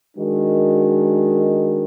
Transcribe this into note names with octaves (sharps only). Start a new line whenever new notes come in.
D#3 G#3 D4 F#4 A#4